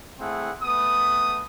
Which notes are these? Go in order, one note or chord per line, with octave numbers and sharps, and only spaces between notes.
A3 C4 E4 G#4 F#5
A3 B3 B4 D#6